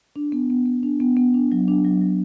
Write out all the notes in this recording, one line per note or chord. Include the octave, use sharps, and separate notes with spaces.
D4
B3
B3
B3
D4
B3
B3
D4
F#3
D4
F#3
F#3